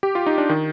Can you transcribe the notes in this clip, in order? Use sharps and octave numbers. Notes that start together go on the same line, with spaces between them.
G4
F4
D#4
D4
D#3